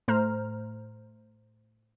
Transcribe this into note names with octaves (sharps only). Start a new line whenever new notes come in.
A2 A3 C5 A#5 F6